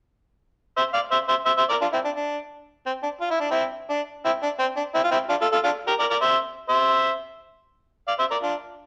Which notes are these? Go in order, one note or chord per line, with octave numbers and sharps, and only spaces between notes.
C5 E5
D5 F5
C5 E5
C5 E5
C5 E5
C5 E5
A#4 D5
D4 F4
C4 E4
D4
D4
C4
D4
F4
E4
D4
C4 E4
D4
C4 E4
D4
C4
D4
C4 E4
F4
C4 E4
D4 F4
F4 A4
F4 A4
D4 F4
G4 A#4
A#4 D5
A#4 D5
C5 E5
C5 E5
D5 F5
C5 E5
A#4 D5
D4 F4